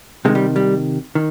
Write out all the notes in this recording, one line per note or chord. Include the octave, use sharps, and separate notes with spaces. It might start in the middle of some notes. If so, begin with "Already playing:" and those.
C3 D#3 G#3
G3
G3
D#3